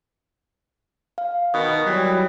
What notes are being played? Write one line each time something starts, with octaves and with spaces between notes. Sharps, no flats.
F5
B2 D#3 D#6
E3 F#3 G3